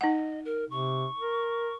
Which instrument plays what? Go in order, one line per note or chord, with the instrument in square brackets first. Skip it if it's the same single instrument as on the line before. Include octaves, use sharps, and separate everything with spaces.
[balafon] D#4 F#5 [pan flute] D#5
[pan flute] A#4
[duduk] C3 [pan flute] C#6
[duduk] A#4